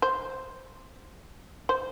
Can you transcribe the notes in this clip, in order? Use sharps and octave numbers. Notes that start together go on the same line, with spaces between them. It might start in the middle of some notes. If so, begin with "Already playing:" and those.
C5
C5